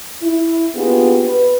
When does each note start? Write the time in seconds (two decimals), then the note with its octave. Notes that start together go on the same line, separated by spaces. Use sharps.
0.22 E4
0.75 A#3 B3 D4 F4 G4 G#4
1.25 B4